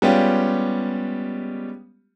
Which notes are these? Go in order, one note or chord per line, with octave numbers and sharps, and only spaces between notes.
G3 G#3 B3 C#4 F4 G4